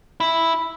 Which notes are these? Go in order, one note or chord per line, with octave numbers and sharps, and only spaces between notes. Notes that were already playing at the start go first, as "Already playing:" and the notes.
E4